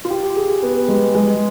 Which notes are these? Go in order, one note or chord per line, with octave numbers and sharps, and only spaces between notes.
F4
G4
G#4
B3
G#3
G#3